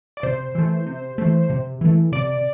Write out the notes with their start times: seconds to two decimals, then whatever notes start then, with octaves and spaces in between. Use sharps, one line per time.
0.17 D5
0.23 C3 C5
0.55 E3 A3
0.86 C3
1.18 E3 A3
1.50 C3
1.81 E3 A3
2.12 C3 D5